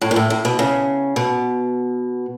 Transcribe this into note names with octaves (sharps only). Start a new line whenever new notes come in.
A2
A#2
A2
A2
B2
C#3
B2